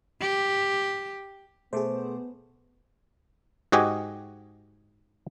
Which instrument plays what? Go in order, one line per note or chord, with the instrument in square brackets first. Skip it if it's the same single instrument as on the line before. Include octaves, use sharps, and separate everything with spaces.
[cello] G4
[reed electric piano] B2 A3 D6 [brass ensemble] B3 [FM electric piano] G#4 C5
[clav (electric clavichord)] G#2 F#4 G4 D#5 G#5